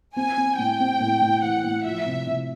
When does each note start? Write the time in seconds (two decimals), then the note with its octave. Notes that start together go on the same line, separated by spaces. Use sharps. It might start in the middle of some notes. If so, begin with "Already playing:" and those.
0.16 C4 G#5
0.37 C4
0.58 A2 G5
0.80 C4
1.00 A2
1.22 A2
1.43 E3 F#5
1.64 A2
1.85 F3 E5
2.06 C3
2.27 C3